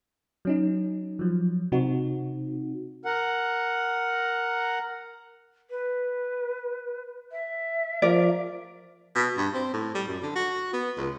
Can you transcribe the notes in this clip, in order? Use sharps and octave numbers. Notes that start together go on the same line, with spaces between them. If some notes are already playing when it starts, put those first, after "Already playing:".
F#3 C#4 D#4
F3 F#3
C3 C4 D#4 F#4
A#4 F#5
B4
E5
F3 A#4 D5
B2
G2
C4
A2
G3
F#2
D3
F#4
B3
C#2